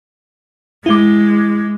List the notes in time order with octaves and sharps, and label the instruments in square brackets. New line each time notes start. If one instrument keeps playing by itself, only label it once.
[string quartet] G#3 [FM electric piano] E4 D6